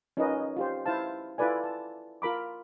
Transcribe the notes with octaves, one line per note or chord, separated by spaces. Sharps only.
C#4 D#4 F4 A#4 B4 D#5
F4 G4 C5
E4 C5 F5 A5
E4 F4 A4 B4 D5 G#5
A5
F4 A#4 B5 D6